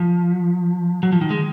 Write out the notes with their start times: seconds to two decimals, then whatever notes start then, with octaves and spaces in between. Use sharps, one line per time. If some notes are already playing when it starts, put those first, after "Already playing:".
Already playing: F3
1.03 F#3
1.12 F3
1.21 D#3
1.30 G#3